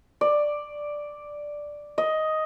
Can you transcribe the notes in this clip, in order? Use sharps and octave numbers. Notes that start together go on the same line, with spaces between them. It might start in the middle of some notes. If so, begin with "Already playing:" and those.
D5
D#5